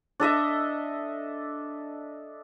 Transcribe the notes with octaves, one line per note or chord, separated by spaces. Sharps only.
D4 A4 D#5 E5